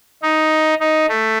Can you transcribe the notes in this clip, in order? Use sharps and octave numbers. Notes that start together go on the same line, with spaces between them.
D#4
D#4
A3